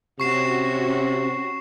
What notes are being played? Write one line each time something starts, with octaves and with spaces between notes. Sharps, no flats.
C3 C#4 F#4 C#6 C7 E7